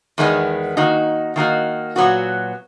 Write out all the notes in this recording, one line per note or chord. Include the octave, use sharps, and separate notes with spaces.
E2 D#3 G#3 B3
D#3 A#3 D#4 F#4
D#3 A#3 D#4 F#4
A#2 F#3 B3 F#4